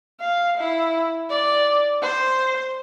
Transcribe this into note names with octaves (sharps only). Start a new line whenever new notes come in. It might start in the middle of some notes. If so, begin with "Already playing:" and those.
F5
E4
D5
C5